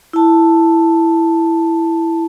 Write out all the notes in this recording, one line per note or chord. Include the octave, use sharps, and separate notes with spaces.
E4 A5